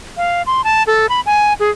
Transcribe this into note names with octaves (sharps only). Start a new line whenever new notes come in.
F5
C6
A5
A4
B5
G#5
G#4